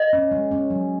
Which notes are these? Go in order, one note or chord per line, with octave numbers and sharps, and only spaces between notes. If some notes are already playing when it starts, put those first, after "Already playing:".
Already playing: D#5
C#4
G#3
C#4
F#3